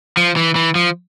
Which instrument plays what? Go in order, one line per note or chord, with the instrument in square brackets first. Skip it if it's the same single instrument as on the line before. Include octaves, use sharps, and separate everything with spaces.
[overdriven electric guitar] F3
E3
E3
F3